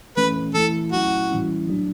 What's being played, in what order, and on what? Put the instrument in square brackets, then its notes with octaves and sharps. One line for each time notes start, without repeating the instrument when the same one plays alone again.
[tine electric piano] E3 A3 C#4 [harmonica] B4
[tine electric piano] E3 A3 E4 [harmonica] A4
[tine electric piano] F#3 A3 C#4 E4 [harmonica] F#4
[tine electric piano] A2 E3 G3 C#4 E4
F#3 A3 D4 F#4